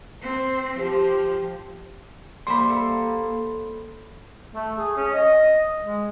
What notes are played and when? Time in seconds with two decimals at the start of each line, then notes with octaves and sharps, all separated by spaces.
0.21 C4
0.79 F3 G4
2.47 G3 A#3 C5 E5 B5 C6
2.69 A4
4.55 A3
4.78 G#4
4.97 C#4
5.13 D#5
5.84 G#3